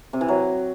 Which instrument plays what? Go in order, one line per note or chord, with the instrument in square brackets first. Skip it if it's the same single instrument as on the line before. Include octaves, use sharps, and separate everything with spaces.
[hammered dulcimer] C3
E3
F#3